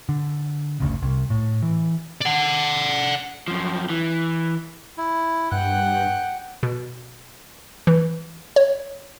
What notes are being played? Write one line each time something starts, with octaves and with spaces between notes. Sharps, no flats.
D3
G1 D2 C#3
C2
A2
E3
D5 F#5
F#2 F3
E3
E4
G2 F#5 G5 F#6
B2
E3
C#5